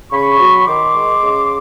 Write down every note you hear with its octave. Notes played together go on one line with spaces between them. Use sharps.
C#3 B5 C#6
F#3
D#3 C6 D6
G#3
C#3